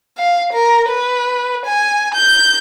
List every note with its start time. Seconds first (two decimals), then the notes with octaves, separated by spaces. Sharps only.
0.18 F5
0.53 A#4
0.89 B4
1.66 G#5
2.15 G6